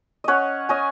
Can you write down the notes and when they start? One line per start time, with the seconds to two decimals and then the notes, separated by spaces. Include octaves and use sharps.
0.24 C#4 C#5 D#5 F#5
0.69 C#4 D#5 G#5